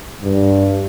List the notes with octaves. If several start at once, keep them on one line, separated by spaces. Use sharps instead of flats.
G2